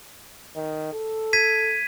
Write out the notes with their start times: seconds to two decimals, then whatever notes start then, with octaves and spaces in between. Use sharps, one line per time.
0.56 D#3
0.93 A4
1.33 G#6 B6 D#7